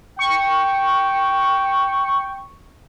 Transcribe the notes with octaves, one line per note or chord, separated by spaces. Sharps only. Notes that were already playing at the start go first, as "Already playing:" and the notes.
G5 C#6